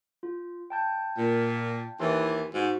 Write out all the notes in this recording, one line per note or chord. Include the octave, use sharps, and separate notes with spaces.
F4
G5 A5 G6
A#2
D#2 E3 C6 E6 A6
G#2 F#4